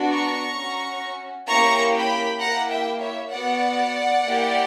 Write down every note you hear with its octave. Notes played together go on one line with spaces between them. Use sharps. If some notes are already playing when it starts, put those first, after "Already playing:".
Already playing: B3 D4 F#4
A#5 C#6
C#4 F#4
A#3 C#4 E4 G4 A#5 C#6
G5 B5
A#3 E4 G4 F#5 A#5
E5 G5
C#5 E5
B3 F#4 D5 F#5
A#3 E4 G4